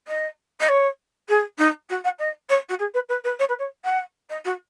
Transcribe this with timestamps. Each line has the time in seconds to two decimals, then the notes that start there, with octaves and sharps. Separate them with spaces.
0.08 D#5
0.60 D#5
0.68 C#5
1.29 G#4
1.58 D#4
1.89 F#4
2.04 F#5
2.19 D#5
2.49 C#5
2.69 F#4
2.79 G#4
2.94 B4
3.09 B4
3.24 B4
3.39 C#5
3.49 B4
3.59 C#5
3.84 F#5
4.29 D#5
4.45 F#4